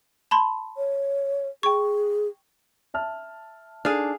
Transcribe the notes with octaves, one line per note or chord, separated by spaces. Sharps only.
A5 B5 C6
C#5
G#4 G5 C#6
E5 A5 F6
D4 D#4 G#4 A4 F5